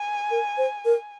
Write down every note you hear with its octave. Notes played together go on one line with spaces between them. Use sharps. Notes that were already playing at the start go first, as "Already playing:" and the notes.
Already playing: G#5
A#4
C5
A#4